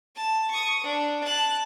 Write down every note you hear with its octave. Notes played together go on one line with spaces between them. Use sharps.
A5
C#6 D#6
D4
A5 F#6